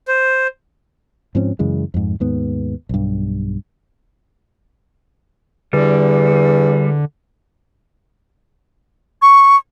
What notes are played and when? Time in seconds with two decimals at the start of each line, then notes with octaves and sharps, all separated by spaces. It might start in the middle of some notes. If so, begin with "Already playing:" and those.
0.08 C5
1.35 G#2 F3 C4 C#4
1.59 F#2 C#3 E3 G#3
1.94 F2 G#2
2.20 D#2 G#2 B3
2.89 B1 G2
5.73 E2 D3 G3
9.22 C#6